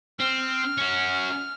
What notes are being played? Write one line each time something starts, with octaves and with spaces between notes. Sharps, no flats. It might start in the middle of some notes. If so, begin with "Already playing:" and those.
C4 F6
C#4 F#4